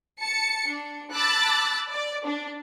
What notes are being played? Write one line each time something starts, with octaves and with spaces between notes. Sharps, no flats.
A5 C#7
D4
A5 B5 D6 E6 F#6 A6
D5
D4